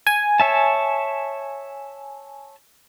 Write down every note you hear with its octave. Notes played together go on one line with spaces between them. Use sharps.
G#5
C#5 E5 A5